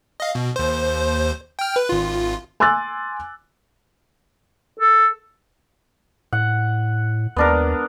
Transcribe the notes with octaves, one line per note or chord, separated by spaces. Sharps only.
D#5 F5
B2
D#2 C5
G5 F6
B4
G#1 F4
G#5 C6 D6 E6 F#6 A6
A4
A2 F#5
D#2 B3 D4 A#4